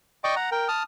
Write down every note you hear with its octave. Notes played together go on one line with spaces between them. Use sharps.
D5 D#5 G5 C#6 D6
F#5 A#5
A#4 G5
A5 D#6 F6